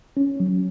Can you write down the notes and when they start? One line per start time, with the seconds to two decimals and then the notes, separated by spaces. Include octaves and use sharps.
0.17 C#4
0.40 F#3